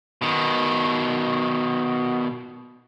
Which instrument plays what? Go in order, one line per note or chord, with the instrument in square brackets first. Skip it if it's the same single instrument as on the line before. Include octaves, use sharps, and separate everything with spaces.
[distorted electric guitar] B2 D#3